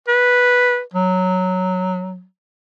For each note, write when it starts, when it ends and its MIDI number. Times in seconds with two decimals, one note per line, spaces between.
0.08 0.81 71
0.94 2.25 54